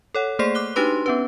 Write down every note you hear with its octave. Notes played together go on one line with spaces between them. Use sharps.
A4 C#5 F#5
A3 A#3 G#4 C5 D5 C7
D6 F#6 G7
D4 D#4 F#4 G4 B4 C6
B3 C#4 B4